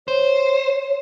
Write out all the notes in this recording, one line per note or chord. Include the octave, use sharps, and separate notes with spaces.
C5 C#5